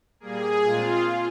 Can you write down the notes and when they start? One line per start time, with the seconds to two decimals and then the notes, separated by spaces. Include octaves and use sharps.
0.20 A#2 G3 A#3 G#4
0.64 A#2 G#3 C4 F4